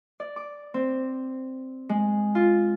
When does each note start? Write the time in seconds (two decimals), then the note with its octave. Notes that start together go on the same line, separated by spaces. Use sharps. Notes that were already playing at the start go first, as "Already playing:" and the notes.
0.20 D5
0.36 D6
0.74 C4
1.89 G#3
2.35 F4